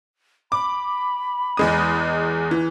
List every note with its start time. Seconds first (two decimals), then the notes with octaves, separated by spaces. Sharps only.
0.52 B5 D6
1.57 E2 G#3 D#6
2.51 E3